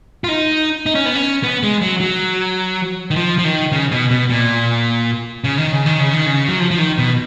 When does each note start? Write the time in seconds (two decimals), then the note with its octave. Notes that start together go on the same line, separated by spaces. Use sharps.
0.24 F4
0.29 D#4
0.86 D#4
0.95 C#4
1.06 B3
1.15 C#4
1.44 B3
1.63 G#3
1.81 F#3
2.00 F#3
3.11 D#3
3.16 F3
3.38 F3
3.44 D#3
3.72 C#3
3.92 B2
4.10 B2
4.30 A#2
5.44 C#3
5.58 D#3
5.72 C#3
5.86 D#3
6.00 C#3
6.13 D#3
6.26 C#3
6.48 F#3
6.60 F3
6.71 F3
6.78 D#3
6.98 B2